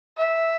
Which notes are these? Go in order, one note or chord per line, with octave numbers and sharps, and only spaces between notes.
E5